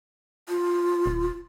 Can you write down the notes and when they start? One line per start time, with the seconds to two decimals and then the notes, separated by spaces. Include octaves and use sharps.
0.49 F4
1.06 D#1